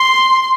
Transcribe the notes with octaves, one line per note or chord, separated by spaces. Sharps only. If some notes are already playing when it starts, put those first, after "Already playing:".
Already playing: C6